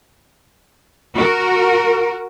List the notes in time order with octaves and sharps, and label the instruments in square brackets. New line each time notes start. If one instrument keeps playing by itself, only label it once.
[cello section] F#4 A#4